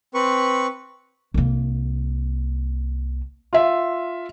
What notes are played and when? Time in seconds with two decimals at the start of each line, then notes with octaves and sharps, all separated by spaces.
0.15 C4 B4 C#6
1.34 C2 A#3
3.53 F4 E5